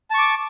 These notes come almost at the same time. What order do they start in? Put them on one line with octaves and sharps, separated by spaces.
A5 C#6 D6